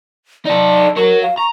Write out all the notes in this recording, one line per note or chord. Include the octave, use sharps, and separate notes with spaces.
D#4 A4 D5
F#4 A#4 C#5
F5
A#5 C#6